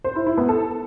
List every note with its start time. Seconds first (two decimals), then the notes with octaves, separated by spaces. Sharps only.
0.04 C5
0.15 E4
0.27 E4
0.38 B3
0.49 A4